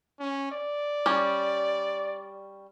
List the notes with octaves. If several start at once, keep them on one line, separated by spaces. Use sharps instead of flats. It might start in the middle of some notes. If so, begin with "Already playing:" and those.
C#4
D5
G3 C#4